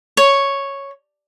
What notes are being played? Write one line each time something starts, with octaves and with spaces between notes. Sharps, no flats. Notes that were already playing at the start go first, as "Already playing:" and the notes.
C#5